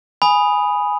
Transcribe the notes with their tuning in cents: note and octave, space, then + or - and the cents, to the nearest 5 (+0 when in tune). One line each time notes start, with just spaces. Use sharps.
G#5 +0 B5 +0 D#6 +0